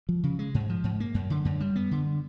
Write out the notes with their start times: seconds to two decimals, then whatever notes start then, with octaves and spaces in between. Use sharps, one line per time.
0.09 F3
0.23 C#3
0.39 G#3
0.54 G#2
0.70 F3
0.84 G#2
1.00 A#3
1.14 F#2
1.30 D3
1.45 F#2
1.60 G3
1.76 B3
1.91 D3